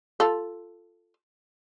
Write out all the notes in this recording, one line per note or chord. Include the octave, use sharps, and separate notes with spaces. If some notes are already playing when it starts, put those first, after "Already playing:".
F4 A4